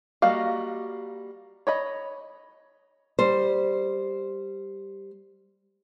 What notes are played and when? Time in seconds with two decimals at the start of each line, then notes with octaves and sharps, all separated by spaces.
0.22 G3 A#3 F#4 D#5 F5
1.67 C#5 D#5 B5
3.19 G3 C5